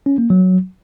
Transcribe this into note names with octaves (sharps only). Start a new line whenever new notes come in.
C#4
A#3
F#3